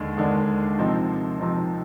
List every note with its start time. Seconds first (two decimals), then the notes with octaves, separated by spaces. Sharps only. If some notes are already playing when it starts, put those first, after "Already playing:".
Already playing: D#2 D3 G#3 D4
0.18 D#2 D3 G#3 D4
0.78 C3 F3 C4 D#4
1.39 C3 F3 C4 D#4